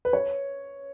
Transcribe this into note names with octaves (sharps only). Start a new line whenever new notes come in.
B4
C#5